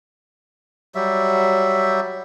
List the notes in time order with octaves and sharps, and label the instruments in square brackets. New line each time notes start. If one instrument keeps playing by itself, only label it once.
[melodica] F#3 G3 E5